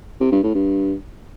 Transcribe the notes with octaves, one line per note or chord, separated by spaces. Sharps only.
C3
G2
A2
G2